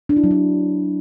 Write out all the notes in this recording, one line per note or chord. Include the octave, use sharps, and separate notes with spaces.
D4
E4
F#3
D4